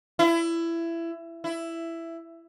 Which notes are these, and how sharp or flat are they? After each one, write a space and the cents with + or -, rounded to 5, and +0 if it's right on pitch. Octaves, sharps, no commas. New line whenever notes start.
E4 +20
E4 +10